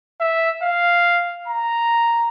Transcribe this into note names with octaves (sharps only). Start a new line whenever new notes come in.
E5
F5
A#5